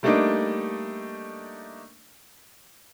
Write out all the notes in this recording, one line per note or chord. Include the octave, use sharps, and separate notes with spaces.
G3 A3 A#3 D4 D#4